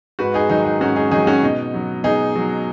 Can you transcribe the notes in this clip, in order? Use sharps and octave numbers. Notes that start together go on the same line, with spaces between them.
G#2 F#4 B4
D#4 G#4
D#3 F#3 D#4
D#4
G#2 C#4 F#4
D#4 G#4
D#3 F#3 D#4 G#4
C#4 F#4
B2 D#4
F#3
B2 D#4 G#4
F#3